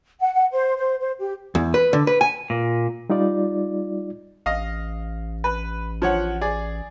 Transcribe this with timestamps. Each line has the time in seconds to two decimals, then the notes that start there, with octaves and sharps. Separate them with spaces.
0.20 F#5
0.34 F#5
0.52 C5
0.76 C5
1.00 C5
1.19 G4
1.55 E2
1.74 B4
1.93 D3
2.07 B4
2.21 G#5
2.50 A#2
3.10 G3 D#4 F4 D5
4.46 A1 D#5 F5
5.44 B4
6.02 F3 C#5 F#5
6.41 G#4 D5